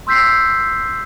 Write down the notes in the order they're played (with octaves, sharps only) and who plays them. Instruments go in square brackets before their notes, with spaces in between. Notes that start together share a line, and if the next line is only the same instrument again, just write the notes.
[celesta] C6 E6 G6 B6 C7